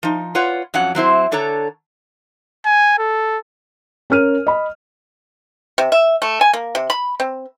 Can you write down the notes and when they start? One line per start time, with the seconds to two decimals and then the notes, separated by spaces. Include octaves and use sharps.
0.03 F3 D#4
0.35 F4 B4 C#5 D5 F#5
0.74 F2 F#3 C#4 F#5
0.95 F#3 C4 E4 C5
1.31 D3 D4 A4 C#5 A#5
2.66 G#5
2.99 A4
4.10 C#4 A#4 F6 D#7
4.47 D#5 B5
5.78 C3
5.92 E5
6.22 A3
6.41 G#5
6.53 A#3
6.75 C3
6.90 B5
7.20 C4